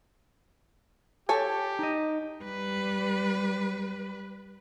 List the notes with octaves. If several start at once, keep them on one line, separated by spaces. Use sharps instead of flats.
G4 A4 C#5 G#5
D#4 D#5
G3 B4